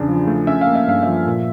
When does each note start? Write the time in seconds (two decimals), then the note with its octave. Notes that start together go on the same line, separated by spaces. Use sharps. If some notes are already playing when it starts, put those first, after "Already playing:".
Already playing: E2 C#3 D4
0.08 F3
0.27 A3
0.47 C#4 E5
0.61 F5
0.67 A#3
0.75 E5
0.87 G2 F5
1.03 F3 E5
1.26 A#2